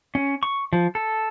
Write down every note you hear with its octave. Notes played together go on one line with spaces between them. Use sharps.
C#4
C#6
F3
A4